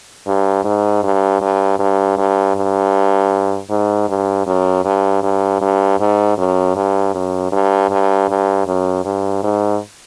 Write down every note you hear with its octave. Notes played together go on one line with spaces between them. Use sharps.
G2
G#2
G2
G2
G2
G2
G2
G#2
G2
F#2
G2
G2
G2
G#2
F#2
G2
F#2
G2
G2
G2
F#2
G2
G#2